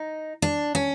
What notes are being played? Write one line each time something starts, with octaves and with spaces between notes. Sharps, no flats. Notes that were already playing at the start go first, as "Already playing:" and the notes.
Already playing: D#4
D4
C#4